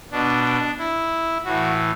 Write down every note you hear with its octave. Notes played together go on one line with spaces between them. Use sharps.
B2 D4
E4
A2 E3 F#4